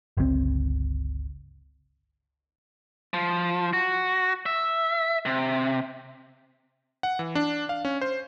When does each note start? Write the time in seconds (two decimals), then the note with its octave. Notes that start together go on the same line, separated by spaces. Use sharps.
0.17 G1 C#2 D3 C4
3.14 F3
3.73 F#4
4.46 E5
5.26 C3
7.03 F#5
7.19 E3
7.35 D4
7.69 F5
7.85 C#4
8.01 C5